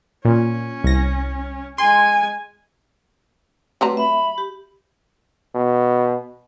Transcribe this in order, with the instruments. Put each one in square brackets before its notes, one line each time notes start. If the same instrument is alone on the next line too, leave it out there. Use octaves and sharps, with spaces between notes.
[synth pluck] A#2 [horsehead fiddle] C#4
[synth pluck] C2 A#6
[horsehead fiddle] G#3 G#5 [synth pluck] C6
[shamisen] F#3 G3 A#5 [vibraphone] A3 C4 B4
[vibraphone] E5 [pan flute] B5
[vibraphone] G4
[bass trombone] B2